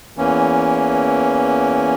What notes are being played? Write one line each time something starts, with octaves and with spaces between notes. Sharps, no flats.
E2 E3 A#3 C#4